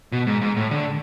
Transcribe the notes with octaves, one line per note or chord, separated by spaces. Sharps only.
B2
G#2
G#2
A2
D3